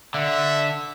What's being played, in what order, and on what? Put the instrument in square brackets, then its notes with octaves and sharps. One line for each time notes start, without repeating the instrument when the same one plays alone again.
[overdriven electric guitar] D3 [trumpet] E5